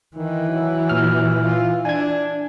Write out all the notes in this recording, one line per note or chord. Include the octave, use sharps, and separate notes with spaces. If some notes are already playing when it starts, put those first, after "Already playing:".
D#3 E3
F#3
A#2 F6
F4
D4 G#5 G#6